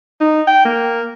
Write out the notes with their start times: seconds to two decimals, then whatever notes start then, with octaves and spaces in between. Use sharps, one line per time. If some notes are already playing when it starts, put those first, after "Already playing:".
0.21 D#4
0.47 G5
0.65 A#3